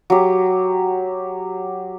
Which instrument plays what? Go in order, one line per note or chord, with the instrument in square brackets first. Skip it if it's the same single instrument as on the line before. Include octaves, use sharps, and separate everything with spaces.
[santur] F#3 G4